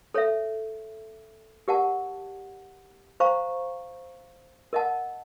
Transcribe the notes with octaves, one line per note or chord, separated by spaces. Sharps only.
A4 C#5 E5
G4 A#4 D5 F#5 A5
C5 F5 A#5 C#6
A#4 D#5 F#5 A5